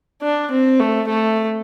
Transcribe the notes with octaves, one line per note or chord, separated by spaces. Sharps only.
D4
C4
A3
A3